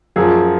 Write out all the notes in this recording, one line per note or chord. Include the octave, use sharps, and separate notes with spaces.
F#2 F3 G#4